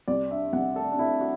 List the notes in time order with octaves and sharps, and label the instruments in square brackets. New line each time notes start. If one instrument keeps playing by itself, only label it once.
[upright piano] C2 [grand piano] D5
[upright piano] D4 [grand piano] E5
[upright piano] C2 [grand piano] F#5
[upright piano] A3 [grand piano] A4
[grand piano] D4
[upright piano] A3 [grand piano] E4
[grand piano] F#4